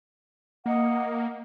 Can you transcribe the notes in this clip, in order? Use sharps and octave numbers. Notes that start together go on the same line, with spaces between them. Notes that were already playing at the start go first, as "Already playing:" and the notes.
A#3 D#5 F#5